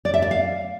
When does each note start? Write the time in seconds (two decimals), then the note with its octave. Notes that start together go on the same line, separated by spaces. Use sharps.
0.05 D5
0.14 E5
0.22 D5
0.31 F5